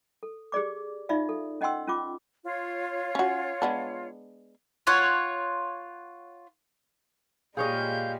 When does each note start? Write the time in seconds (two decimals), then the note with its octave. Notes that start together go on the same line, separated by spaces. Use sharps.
0.23 A4
0.52 G4 G#4 D5 D6
1.09 D#4 F4 D5 E5 F5
1.29 A4
1.61 C#4 D#5 F#5 G5 C6 E6
1.88 C#4 F4 D6
2.45 F4 C#5
3.15 C#4 F#4
3.62 G#3 B3 D4
4.87 F4 C#5 F#5
7.57 A#2 G3 G#3 G#4 C#5 D#5 F5 G6